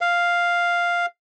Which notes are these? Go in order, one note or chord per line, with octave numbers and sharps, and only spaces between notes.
F5